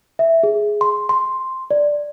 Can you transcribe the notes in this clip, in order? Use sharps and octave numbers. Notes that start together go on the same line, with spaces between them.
E5
G#4
C6
C6
D5